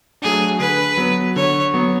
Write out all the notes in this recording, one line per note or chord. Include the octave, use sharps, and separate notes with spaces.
F#3 A3 D4 G#4
D3 B4
F#3 B3
D3 C#5
F#3 B3